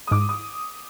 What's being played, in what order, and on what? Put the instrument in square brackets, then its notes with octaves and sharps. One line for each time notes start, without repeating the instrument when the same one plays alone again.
[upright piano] D#6
[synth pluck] G#2 [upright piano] D6
[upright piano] D#6